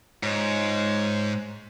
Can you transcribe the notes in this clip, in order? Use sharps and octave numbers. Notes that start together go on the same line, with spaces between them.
G#2 F4 C#5